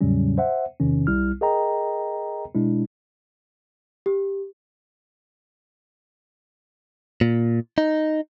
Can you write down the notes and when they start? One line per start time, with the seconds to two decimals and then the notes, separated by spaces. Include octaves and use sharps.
0.01 E2 A2 C#3 F#3 G3 C#4
0.38 C5 E5 F#5
0.80 E2 C3 D#3 C#4
1.07 B1 G3 E4 F6
1.41 G#4 A#4 D#5 G5 A#5
2.55 B2 G#3 D4 E4
4.06 G4
7.21 A#2
7.78 D#4